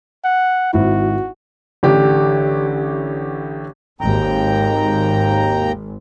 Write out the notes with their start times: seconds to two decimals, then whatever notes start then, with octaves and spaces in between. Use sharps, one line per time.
0.25 F#5
0.73 G#1 E4 F#4
1.83 A1 D3 G4
4.01 G#1 D#2 G5 A#5